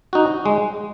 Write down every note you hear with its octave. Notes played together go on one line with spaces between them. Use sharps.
D#4 F#4
G#3